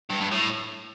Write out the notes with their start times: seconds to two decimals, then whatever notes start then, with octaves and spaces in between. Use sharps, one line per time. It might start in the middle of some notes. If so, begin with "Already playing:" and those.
0.10 G2
0.21 G2
0.31 A2